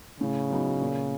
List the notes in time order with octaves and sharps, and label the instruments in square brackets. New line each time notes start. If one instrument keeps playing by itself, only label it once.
[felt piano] A2 [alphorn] C#3
[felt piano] F#3 B3 D#4
A#2